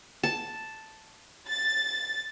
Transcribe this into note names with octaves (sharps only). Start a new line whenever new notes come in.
A5
A6